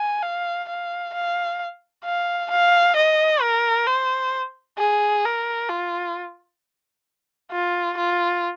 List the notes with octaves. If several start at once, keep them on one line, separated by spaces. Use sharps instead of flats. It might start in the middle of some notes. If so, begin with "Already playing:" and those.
Already playing: G#5
F5
F5
F5
F5
F5
D#5
A#4
C5
G#4
A#4
F4
F4
F4